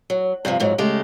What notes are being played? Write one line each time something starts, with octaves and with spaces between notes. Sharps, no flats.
F#3
G2 C3 D#3 F3
F2 G#2 F#3
C#3 G#3 A3 G4